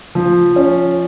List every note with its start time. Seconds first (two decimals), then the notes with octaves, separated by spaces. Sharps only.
0.15 F3
0.56 C#4